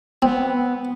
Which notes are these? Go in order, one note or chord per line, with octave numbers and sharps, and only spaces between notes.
B3 C4